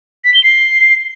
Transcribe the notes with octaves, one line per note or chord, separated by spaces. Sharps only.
B6
G7
C7